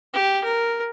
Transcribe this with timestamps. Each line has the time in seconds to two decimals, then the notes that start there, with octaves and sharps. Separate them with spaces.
0.13 G4
0.44 A#4